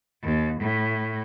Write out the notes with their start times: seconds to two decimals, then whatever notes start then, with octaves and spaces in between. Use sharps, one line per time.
0.23 D#2
0.61 A2